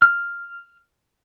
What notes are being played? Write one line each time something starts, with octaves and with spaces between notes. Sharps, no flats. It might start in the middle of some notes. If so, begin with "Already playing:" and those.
F6